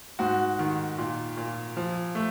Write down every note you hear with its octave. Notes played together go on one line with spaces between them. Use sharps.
G#2 F#4
D#3
A#2
A#2
F3
A3